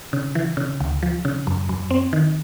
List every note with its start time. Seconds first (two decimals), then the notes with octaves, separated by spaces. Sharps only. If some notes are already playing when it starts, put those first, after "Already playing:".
0.13 C#3
0.35 E3
0.57 C#3
0.80 D2
1.03 F3
1.25 C#3
1.47 F#2
1.69 F#2
1.91 C4
2.13 D#3